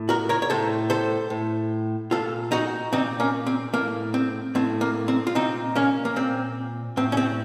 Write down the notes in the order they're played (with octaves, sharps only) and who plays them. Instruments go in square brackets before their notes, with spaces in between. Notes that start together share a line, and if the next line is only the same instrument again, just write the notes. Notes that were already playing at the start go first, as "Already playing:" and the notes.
Already playing: [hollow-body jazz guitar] A2
F#4 A#4
A#4 C#5
C#5
A2 A4 C5
A4 C5
A2
A#2 F4 A4
D#4 F#4
A#2 C4 D#4
A#3 C#4
C4
A2 A#3
C4
A2 C4
A#3
C4
F4
A#2 C4 D#4
A#3 C#4
A#3
A#2 C4
A2 C4
C#4
C4